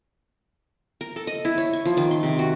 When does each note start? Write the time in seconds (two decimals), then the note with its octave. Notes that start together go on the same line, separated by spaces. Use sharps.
1.01 A#4
1.16 A4
1.27 D#5
1.45 E4
1.58 C#5
1.73 C#6
1.85 F3
1.97 D#3
2.11 C6
2.23 C3
2.39 F#4